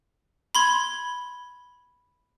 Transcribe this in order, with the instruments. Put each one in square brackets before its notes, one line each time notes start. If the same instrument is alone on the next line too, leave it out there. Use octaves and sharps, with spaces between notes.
[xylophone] B5 C6 G#6